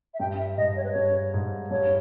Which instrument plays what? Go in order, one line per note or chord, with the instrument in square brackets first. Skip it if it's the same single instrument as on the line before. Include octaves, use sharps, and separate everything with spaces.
[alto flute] E5
[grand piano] G2 [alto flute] G5
[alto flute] E5
[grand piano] G#2 [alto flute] D#5
[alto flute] C#5
B4
[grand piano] G2 [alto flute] C#5
[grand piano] G#2
[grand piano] G2 [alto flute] C#5